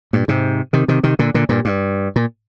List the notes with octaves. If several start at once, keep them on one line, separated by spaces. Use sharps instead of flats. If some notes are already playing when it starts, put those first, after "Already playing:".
G2 A#2
G#2 C3
C3 D#3
C3 D#3
C3 D#3
A#2 D3
A#2 D3
G2 A#2
G2
A#2